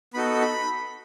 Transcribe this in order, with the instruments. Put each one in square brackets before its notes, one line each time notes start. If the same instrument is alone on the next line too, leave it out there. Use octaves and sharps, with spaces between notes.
[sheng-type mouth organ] B3 D#4 F#4 A4 B5
B5